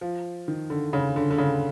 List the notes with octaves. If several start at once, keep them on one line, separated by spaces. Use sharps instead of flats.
F3
D#3
D3
C#3
D3
D3
C#3